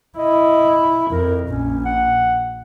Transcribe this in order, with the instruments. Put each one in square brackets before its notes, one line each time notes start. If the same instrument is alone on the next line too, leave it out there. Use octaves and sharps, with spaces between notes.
[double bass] E4 [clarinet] D#5
[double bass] F2 [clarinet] A#4
[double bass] A#1 [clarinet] C#4
[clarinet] F#5